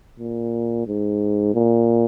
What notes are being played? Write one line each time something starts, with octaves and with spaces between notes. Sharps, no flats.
A#2
G#2
A#2